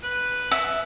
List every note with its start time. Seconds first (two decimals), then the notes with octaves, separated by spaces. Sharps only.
0.03 B4
0.51 E5